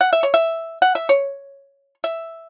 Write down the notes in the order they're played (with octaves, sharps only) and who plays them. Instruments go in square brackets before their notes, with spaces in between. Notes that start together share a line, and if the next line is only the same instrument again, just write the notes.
[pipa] F#5
E5
C#5
E5
F#5
E5
C#5
E5